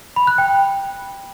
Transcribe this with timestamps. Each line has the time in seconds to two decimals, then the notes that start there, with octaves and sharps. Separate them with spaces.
0.16 B5
0.27 F#6
0.38 G5